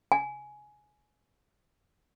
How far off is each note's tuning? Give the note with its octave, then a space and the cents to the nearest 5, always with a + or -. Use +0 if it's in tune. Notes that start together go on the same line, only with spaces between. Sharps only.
G#5 +15